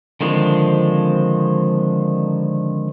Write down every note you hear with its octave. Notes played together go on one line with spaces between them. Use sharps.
D3 D#3 F3 G#3 C4